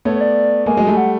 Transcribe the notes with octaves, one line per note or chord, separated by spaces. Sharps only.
A3 B3 C#5
C#5
D5
G#3 A#3 G#5
F#3 G#3
G3 A3
F#5